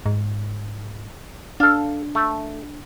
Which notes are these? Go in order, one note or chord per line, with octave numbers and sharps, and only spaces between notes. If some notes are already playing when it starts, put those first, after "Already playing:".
G#2
D4 A4 F5
A3